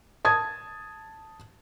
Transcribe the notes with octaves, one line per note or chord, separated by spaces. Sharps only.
A5 D#6 G#6